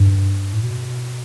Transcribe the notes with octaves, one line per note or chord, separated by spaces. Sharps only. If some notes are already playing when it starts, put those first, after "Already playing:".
Already playing: G2
A2
B2